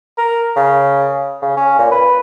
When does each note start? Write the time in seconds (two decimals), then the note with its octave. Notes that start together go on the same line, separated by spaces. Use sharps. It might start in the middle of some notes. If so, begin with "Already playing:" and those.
0.18 A#4
0.56 C#3
1.42 C#3
1.57 C#4
1.79 A#2
1.91 B4